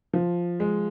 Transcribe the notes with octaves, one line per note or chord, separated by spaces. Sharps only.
F3
G#3